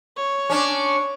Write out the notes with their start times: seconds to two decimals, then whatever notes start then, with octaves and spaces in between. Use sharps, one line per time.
0.17 C#5
0.50 C#4 D4